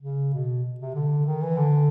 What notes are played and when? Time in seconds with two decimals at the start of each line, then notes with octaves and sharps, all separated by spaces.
0.02 C#3
0.34 B2
0.80 C3
0.95 D3
1.26 D#3
1.43 E3
1.58 D3